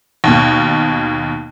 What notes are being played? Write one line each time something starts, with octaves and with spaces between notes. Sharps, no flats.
D#2 B2